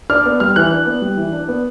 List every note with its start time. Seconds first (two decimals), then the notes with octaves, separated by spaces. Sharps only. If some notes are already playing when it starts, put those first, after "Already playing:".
0.10 D4 F6
0.26 B3
0.40 G3 F6
0.56 E3 F#6
0.72 D4
0.86 B3
1.02 G3
1.17 E3
1.33 D4
1.48 B3